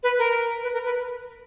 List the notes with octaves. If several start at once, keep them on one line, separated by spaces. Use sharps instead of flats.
B4
A#4
B4
A#4
B4